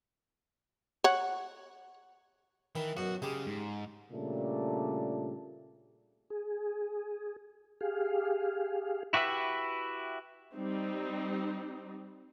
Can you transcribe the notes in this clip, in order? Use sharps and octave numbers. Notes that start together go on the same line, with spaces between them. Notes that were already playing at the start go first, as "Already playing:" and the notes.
C#5 F#5
D#3 E3
F#2 B2 F#4
C#3 G#3 G4
G#2
A#2 C#3 G3 A3 D4
G#4
G4 G#4 F5
E4 F#4 G4 B4 E5
G3 C4 D#4